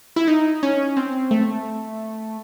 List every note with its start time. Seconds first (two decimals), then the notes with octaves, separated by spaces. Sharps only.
0.16 E4
0.28 D#4
0.63 C#4
0.97 C4
1.31 A3